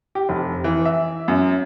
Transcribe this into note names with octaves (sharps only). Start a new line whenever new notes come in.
G4
F1
E3
E5
F#2